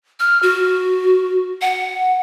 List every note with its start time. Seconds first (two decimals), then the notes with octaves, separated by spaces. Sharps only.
0.20 F6
0.43 F#4
1.62 F#5